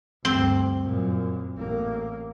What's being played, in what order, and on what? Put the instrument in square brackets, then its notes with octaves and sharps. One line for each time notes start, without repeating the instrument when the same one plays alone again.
[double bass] D2 G2 [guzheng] C4
[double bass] F#2 A#2
A1 A#3